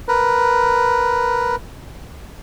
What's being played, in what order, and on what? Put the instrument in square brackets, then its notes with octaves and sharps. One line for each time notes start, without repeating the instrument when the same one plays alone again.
[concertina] A#4 B4